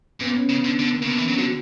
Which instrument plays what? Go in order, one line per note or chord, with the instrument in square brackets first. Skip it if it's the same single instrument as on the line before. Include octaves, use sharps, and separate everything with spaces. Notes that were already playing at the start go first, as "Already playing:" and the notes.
[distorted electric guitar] A#2 [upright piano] B3
[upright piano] C#4
[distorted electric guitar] C#3 [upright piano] C#4
[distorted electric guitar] D3 [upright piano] D4
[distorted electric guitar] D3 [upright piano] B3
[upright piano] A#3
[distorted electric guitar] C#3
[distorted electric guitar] D3 [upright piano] B3
[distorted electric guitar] E3 [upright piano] C#4
[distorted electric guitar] F#3 [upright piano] D4
[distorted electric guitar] D3 [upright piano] F#4